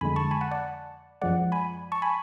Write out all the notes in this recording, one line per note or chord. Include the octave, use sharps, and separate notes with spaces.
F2 D3 G#3 G#5 B5
A5 C#6
G#5 B5
F#5 A5
D5 F#5
F#2 F3 G#3 D5 F#5
G#5 B5
A5 C#6
G#5 B5